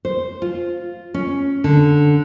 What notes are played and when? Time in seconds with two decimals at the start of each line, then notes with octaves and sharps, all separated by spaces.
0.05 C5
0.42 F4
1.14 C#4
1.64 D3